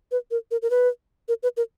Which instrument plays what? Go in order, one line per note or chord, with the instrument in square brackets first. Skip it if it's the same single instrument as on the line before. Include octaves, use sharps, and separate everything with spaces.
[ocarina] B4
A#4
A#4
A#4
B4
A#4
B4
A#4